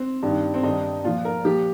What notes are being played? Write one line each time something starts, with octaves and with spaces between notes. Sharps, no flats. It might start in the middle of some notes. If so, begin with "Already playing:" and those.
Already playing: C4
G2 D#3
C4
G2 D#3 D#4
A#2 F3 F4
A#4
A#2 F3 G4